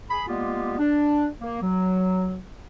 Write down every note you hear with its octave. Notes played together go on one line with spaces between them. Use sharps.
G#4 B5
G3 G#3 A#3 B3 F4 G4
D4
A#3
F#3